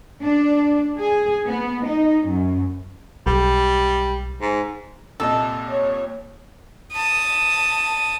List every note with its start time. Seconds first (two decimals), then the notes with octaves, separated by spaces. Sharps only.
0.23 D4
1.00 G#4
1.48 B3
1.87 D#4
2.29 F#2
3.27 B1 G3
4.41 G#2
5.20 C2 A#2 A4 D#5
5.69 C#5
6.93 A5 D#6